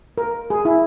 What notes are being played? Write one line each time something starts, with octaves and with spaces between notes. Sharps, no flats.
A#4
G#4
E4